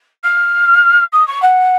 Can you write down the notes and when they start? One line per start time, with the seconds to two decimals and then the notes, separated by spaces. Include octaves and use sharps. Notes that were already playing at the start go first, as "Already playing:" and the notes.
0.23 F6
1.12 D#6
1.27 C#6
1.42 F#5